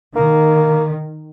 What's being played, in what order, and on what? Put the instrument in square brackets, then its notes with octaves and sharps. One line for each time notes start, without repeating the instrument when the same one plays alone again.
[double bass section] D#3 [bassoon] A#3